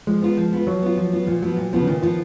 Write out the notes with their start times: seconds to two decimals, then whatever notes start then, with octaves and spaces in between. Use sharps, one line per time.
0.07 F3 G#3
0.22 B3 F4
0.37 F3
0.52 B3 F4
0.67 F3 F#3
0.82 B3 F4
0.97 F3
1.12 B3 F4
1.27 A#2 F3
1.42 F3 F#3 B3 F4
1.57 A#2
1.72 B2 F3 B3 F4
1.81 C#3
1.87 A#2 D#3
2.02 F3 B3 F4